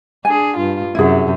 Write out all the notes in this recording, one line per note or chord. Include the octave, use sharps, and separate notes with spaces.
D4 G#4 G#5
G2 F4
F#2 C3 E4 G#4